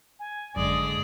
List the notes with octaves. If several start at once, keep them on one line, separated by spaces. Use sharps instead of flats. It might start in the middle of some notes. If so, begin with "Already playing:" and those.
G#5
G#1 F#2 D3 G#3 D5 D#6